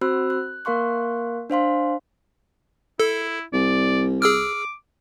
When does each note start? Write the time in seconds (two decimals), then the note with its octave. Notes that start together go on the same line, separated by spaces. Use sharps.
0.01 C4 F#4 C5 B5 E6 F#6
0.30 F#6
0.65 A#3 A#4 F5 C6 C#6 F#6
1.50 D4 C5 F5 C6
3.00 E4 A4
3.53 C2 D5
4.22 G#4 D6 E6 F6